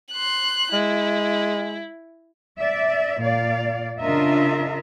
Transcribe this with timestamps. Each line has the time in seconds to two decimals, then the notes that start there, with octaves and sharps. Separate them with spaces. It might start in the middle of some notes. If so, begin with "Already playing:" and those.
0.13 C6 F#6
0.73 G#3 E4
2.56 D5 E5
3.18 A#2 D5 F5
4.00 C#3 D4 F4 A#4 D#5 E5